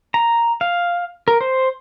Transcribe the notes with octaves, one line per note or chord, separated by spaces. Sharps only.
A#5
F5
A#4
C5